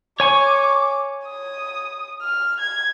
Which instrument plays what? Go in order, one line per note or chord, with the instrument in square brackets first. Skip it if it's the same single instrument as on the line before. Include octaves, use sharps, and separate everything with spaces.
[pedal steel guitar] C#5 G#5 C#6 [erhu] D6
[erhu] D#6
F6
G#6